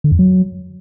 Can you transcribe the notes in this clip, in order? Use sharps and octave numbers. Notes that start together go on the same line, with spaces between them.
D3
F2
F#3